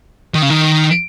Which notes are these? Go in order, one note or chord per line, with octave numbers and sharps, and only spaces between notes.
D#3
C#3
D#3